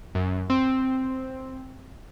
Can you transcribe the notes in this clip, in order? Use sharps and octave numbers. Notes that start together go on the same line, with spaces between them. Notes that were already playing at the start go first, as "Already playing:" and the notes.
F#2
C4